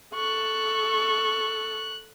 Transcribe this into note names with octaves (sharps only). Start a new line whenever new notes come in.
A4 C#6 F#6